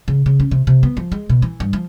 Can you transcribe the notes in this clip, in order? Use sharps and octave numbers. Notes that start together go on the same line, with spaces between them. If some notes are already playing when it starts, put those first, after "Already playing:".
C#3
C#3
C#4
C3
C3
B3
F3
G#3
B2
E3
G2
F3